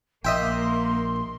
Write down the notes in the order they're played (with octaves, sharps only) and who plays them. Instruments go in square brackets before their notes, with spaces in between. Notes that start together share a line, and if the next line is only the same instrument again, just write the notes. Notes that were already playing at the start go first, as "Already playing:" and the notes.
[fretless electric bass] A#1 [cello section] A#3 [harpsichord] D#5 E5 G5 [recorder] C6